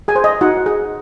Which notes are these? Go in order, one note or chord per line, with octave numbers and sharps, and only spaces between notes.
G#4 G#5
C5
D#5
D#4 F#4 F#5
G#4